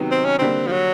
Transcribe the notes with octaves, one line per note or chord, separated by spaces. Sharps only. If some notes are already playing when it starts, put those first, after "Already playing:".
Already playing: C3 D#3 F#3 B3 D#4
C4
C#4
D3 G3 A#3 C4
F3
F#3